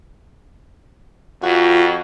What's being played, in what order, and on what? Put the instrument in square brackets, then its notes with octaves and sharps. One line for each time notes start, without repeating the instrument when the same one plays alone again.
[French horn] F2 [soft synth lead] F4 [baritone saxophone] F#4